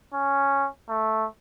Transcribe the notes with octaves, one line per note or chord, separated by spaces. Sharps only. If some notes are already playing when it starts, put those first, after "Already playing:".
C#4
A3